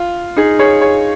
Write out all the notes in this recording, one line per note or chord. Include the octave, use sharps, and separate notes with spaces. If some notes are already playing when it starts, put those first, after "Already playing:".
Already playing: F4
D#4 G#4
G#4 C#5
G#4 C#5